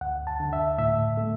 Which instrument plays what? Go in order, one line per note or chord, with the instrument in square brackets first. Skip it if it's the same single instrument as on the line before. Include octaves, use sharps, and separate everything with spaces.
[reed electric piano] D2 F#5
A5
D3
E5
A2 E5
A3